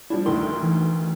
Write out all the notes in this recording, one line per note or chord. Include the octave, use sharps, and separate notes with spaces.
F3 G3 D4 E4
D2 D3 D#3 C6
E3